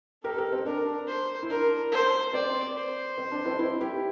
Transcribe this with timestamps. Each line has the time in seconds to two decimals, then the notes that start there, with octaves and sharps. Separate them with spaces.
0.24 G4 A4 A#4
0.38 G4 A#4
0.52 C4
0.66 D4 A#4
1.08 C5
1.43 E4
1.50 D4 A#4
1.92 C5
2.33 C4 D5
2.75 C5
3.18 C4
3.32 D4
3.45 C4 E4
3.59 C4 E4
3.81 E4 G4